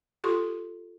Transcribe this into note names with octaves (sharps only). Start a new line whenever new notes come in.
F4 G4 A4 C6 C#6